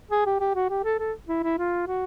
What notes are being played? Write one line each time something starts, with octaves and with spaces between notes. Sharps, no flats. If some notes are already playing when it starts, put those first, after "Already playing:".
G#4
G4
G4
F#4
G4
A4
A4
E4
E4
F4
F#4